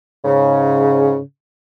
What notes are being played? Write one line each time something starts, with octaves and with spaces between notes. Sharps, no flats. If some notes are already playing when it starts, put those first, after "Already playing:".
G#2 C#3